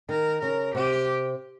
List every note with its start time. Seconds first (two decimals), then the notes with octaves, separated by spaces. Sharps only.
0.09 D#3 A#4
0.41 C#3 A#4
0.74 C3 G4